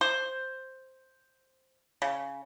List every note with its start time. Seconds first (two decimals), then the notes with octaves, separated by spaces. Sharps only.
0.01 C5
2.02 C#3